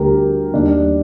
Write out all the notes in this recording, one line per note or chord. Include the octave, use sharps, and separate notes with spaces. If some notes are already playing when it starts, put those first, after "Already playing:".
Already playing: D2 D3 G3 G4 A#4
D#2 D#3 G3 D4